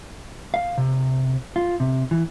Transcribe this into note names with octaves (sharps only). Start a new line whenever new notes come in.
F5
C3
F4
C3
E3